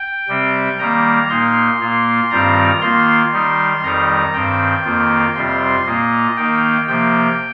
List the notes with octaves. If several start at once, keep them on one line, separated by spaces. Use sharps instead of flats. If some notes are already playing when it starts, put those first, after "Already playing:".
Already playing: G5
C3 G3 C4
D#3 G3 A#3 A#5
A#2 A#3 D#4 C6
A#2 A#3 F4
G2 D#3 G3 C4 F4 A#5
D#3 A#3 F4 C6
D#3 G3 D#4
F2 D#3 G3 D#4 A#5
G2 D#3 C4 G5
F2 D#3 A#3 F4
F2 C3 G3 C4 F4 C6
A#2 A#3 F4 D#5
D#3 A#3 D#4 G5
C3 F3 A#3 G5